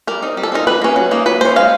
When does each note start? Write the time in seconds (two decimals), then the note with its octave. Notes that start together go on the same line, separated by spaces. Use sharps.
0.07 G3 A#4
0.23 C4 D#4
0.37 G3
0.43 A4
0.52 C4 D#4 A#4
0.67 G3 B4
0.82 A#3 C#4
0.96 F#3
1.11 A#3 D#4
1.26 F#3 B4
1.41 A#3 C#4 C5
1.56 G#3 F5